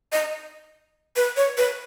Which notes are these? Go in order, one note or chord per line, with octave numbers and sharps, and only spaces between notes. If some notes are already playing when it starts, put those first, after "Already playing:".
D#5
B4
C#5
B4